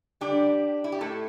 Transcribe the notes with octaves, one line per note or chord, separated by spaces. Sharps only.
D3 G3 D4 G4
E4
G4
A2 A3 E4 A4